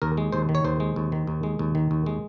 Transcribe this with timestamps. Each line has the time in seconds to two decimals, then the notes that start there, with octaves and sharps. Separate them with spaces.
0.02 D#2 A#4
0.17 G#3
0.32 D#2 C5
0.49 D#3
0.55 C#5
0.64 D#2 C5
0.80 G#3
0.96 D#2
1.12 D#3
1.27 D#2
1.43 G#3
1.59 D#2
1.75 D#3
1.91 D#2
2.06 G#3